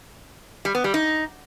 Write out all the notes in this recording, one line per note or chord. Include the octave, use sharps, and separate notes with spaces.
G3
B3
G3
D#4